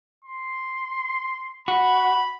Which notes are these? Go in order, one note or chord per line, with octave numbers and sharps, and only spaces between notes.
C6
F#4 B5